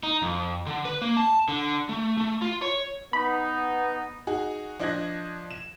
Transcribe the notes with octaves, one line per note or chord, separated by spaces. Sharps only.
D#4
F2
D3
B4
A#3
A5
D3
A3
A3
F4
C#5
B3 D#4 B5
D#4 F#4 G#4
F3 D4 D#5 F#6 G#6 A#6
E7